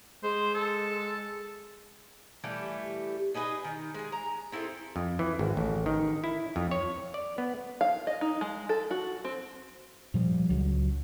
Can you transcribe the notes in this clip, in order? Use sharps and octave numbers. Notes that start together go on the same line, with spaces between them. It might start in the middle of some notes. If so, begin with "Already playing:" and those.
G#3 C5
A4
E3 G3 A3 G4
D#4 G#4 B4 D#5
D#3
G#3 G#4
A#5
C4 E4 G#4 A4
F2
E3
G#1
A1
D#3
E4
F2
C#5
D5
B3
F5
D#5
D#4
G#3
A4
F#4
C4
A#2 F3 G3
C#2 F#3